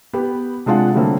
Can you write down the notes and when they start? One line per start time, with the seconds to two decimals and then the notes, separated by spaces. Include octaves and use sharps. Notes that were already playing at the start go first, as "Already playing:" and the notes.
0.13 B3 G4 B4
0.66 C3 G#3 D4 F4 F#5
0.95 D3 F#3 G3 A3 A#3 C4